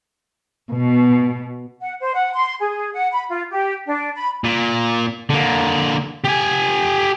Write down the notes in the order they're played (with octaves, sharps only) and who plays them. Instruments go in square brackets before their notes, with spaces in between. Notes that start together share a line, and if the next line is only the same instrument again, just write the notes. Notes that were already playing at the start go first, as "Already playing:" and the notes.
[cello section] B2
[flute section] F#5
C5
F#5
C6
G#4
F#5
B5
F4
G4
D4
B5
[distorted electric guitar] A#2
D3 A#3
G4 G#5